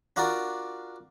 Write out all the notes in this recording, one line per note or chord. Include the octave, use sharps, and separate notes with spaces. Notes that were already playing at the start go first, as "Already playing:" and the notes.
D4 F4 F#4 A#4 D5